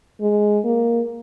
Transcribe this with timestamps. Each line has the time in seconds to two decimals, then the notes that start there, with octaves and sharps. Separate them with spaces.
0.21 G#3
0.64 A#3